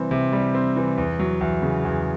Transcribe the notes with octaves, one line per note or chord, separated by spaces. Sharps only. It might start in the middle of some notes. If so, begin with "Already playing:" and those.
Already playing: C3 E3 G3 C4
C3
G3
C4
E3
E2
F#3
E2
C#3
E2